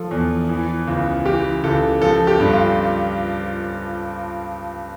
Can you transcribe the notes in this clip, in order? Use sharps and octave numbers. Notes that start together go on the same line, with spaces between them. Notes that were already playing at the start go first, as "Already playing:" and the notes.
Already playing: F3 A4
E2
E3
C#2
E3 G4
C#2 A4
F3 A4
G4
G2
F4